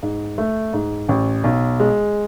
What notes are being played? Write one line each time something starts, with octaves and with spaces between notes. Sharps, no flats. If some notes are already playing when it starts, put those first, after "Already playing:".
G#2
A3
G#2
A1
B1
G#3